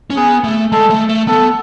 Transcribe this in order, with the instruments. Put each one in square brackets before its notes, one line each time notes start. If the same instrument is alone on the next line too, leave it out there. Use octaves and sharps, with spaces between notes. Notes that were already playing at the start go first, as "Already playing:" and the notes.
[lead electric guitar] C#4
[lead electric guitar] B3 [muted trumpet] G#4
[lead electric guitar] A3
[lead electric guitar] G#3 [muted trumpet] A4
[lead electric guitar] A3
A3
[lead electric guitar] B3 [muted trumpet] A4